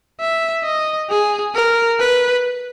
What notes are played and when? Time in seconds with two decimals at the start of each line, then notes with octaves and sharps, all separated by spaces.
0.20 E5
0.65 D#5
1.10 G#4
1.54 A#4
2.00 B4